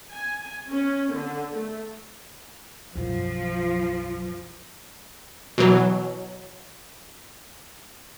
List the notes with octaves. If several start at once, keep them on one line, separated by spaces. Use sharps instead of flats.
G#5
C#4
D3
A3
B1 F#2 F3
B2 E3 F#3